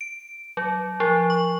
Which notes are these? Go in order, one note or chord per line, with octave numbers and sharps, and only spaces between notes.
D7
F#3
F3
C#6